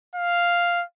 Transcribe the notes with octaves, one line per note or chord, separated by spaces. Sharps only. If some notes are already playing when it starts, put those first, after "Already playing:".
F5